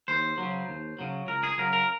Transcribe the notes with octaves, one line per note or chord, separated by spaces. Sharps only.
D#2 C5
C#3 F#3
D#2
C#3 F#3
C#2 A#4
G#4
C#3 F#3 A#4
A#4